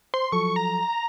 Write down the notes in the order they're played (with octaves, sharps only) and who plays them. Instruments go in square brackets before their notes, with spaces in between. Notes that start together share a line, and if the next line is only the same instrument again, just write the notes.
[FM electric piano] C5 [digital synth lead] C6
[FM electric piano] F3 F#3 A4 [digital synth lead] C#6
[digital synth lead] A#5